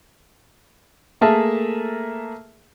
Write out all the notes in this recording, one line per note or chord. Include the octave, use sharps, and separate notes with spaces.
A3 A#3 G#4 A#4 E5 A5